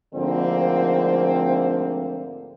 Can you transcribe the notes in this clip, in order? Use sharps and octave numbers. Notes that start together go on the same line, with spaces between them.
D2 G#2 D3 F3 A#3 C4